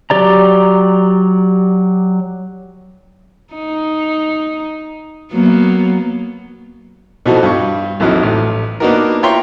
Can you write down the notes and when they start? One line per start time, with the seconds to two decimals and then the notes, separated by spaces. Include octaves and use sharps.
0.10 F#3 G4 D5 A#5
3.54 D#4
5.32 F#3 A#3 B3
7.26 B2 E3 F3 D#4 F#4 A4
7.43 G2 C#6
8.00 A#1 F2 E3 F#3 D#4 F6
8.23 A1
8.80 A#3 B3 D4 D#4 F#4 A#4
9.22 E4 F4 C#5 G5 A#5 C6